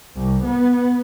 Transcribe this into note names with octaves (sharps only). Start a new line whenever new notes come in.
C2
B3